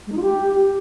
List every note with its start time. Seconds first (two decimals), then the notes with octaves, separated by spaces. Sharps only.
0.07 G#3
0.12 D#4
0.17 F4
0.22 G4